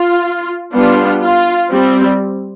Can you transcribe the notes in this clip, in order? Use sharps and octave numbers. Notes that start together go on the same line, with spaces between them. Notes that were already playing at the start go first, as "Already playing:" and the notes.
Already playing: F4
G3 B3 D4 F4
F4
G3 C4